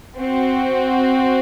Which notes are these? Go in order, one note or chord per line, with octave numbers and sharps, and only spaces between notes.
C4 F#4